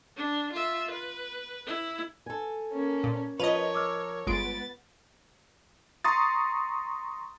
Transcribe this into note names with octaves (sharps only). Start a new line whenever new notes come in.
D4
F4 E5
B4
E4
A4 G#5
A#3 C#4
A#2
F3 F4 A#4 B4 C#5 D#5 F7
D6 E6 F6
G1 G#3 B3 F4 A6 D7
A#5 C6 C#6 D#6 A6